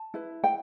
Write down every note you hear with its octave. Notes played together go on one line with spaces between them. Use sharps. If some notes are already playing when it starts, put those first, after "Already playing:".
Already playing: A5
E4 B4
G5